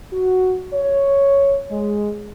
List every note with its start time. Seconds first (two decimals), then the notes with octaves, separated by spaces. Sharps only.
0.13 F#4
0.74 C#5
1.71 G#3